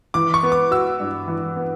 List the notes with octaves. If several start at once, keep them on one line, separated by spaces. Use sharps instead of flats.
E3 D6
C#6
B3
D6
F#4 E6
G2
E3
B3